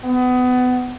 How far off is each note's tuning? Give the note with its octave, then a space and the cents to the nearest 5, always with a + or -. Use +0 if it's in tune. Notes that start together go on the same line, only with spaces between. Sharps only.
B3 +25